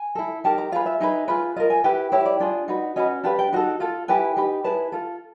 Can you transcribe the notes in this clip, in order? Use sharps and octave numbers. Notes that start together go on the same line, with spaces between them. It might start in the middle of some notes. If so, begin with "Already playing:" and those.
Already playing: G#5
E4 A4
D#4 G4 A#4 A5
A#5
F4 G#4 B4 F5
E5
D#4 G#4 B4
F4 G#4 B4
F4 A#4 D#5
G#5
E4 G4 B4 G5
E4 G4 B4 C#5
D5
D4 F4 G#4 D5
D#4 F#4 B4
C#4 F#4 B4 D#5
D4 G4 B4 F5
G5
D#4 F#4 A4
F4 A4
E4 G4 B4 G#5
D#4 G4 B4
E4 G#4 B4 A5
F4 A4